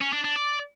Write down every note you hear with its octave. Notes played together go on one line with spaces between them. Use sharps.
C#4
D4
D4
D5